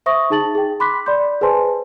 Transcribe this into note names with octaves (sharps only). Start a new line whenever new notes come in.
C5 E5 C#6 D#6 A#6
D#4 G#4 A5 A6 F#7
G#4 G5
B5 C6 D6 F#6 B6
D5 B5 C6 G6
G#4 B4 C5 G#5 A5 C6